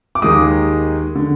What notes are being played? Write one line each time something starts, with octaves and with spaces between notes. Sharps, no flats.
D6
D#2 D#3 G#3 D#6
D3